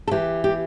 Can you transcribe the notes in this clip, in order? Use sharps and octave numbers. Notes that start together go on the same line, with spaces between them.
A4
E3 G4
G4